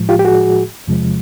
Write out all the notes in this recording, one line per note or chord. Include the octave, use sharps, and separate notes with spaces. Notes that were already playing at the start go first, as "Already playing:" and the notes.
Already playing: A2 F3 G#3
F4 G4
G4
F#4 G#4
E2 C3 F3 G#3